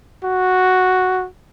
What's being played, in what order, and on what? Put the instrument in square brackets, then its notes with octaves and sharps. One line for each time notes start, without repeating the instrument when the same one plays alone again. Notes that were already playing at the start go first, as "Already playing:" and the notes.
[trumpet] F#4